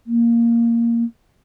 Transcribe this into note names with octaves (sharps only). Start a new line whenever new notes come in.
A#3